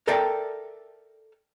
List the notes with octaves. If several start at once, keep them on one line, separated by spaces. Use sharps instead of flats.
A4 A#4 D5 E5 G5 A5